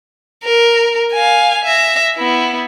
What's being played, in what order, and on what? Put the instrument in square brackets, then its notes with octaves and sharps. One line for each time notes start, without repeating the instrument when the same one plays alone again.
[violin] A#4
F5 G#5
E5 A#6
B3 E4